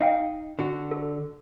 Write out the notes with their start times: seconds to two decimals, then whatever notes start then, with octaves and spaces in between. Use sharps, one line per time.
0.01 D#4 D#5 F5 G5
0.59 D3 F#4
0.91 A4